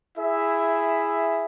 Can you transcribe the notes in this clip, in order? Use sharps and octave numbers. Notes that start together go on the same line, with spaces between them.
E4 G#4 E5